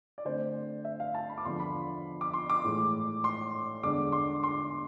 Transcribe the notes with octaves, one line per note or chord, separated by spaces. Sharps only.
D5
D3 A3 C4 C5
E5
F5
A5
B5
D6
E2 D3 F3 B3 C6
B5
D6
C6
D6
A2 E3 G#3
C6
E2 D3 G#3 D4 D6
C6
C6